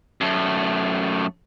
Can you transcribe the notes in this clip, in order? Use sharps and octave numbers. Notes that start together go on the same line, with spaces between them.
F#2 A3